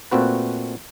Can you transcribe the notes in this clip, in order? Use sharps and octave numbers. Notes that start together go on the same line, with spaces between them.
A#2 A3 C4 F#4 B4